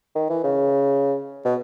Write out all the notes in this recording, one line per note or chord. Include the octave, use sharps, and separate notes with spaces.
D#3
E3
C#3
B2